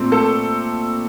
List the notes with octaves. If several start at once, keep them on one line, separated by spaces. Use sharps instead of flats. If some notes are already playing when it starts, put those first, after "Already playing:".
Already playing: A#2 A3 C4
A4